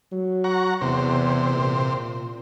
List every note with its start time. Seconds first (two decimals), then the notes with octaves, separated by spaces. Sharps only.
0.12 F#3
0.44 F#5 A#5 C#6
0.81 E2 C3 C5
1.55 A#2